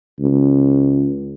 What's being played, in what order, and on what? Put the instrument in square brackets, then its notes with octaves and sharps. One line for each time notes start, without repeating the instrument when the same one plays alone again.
[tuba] C#2